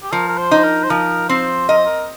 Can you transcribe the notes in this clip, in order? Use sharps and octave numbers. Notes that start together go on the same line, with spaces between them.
G4
F3 A#4
A#4
C5
D#4
C5
A#4
C5
F3 A#4
C4 C5
A#4 D#5
C5
A#4